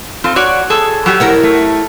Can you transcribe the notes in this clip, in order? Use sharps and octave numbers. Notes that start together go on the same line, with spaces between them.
C4 F4 A4
F#4 C#5 D5
G#4 A4
F#3 F#4 G4
E4 A#4 C#5
A3